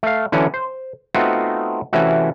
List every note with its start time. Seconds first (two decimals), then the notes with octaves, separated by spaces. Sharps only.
0.03 A3 F5
0.32 D3 E3 F#3 C#4 D4
0.54 C5
1.15 A3 B3 C4 D#4 F4 F#4
1.93 C3 E3 A3 C#4 E4 F#4